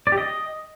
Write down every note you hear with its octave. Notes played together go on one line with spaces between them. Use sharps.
D5
G4
D#5